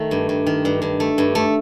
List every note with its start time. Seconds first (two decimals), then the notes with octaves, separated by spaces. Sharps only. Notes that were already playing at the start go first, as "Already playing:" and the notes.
Already playing: D#3 A3
0.11 G2
0.29 G2
0.47 D#3
0.65 G2
0.82 G2
1.00 A3
1.18 G2
1.35 A3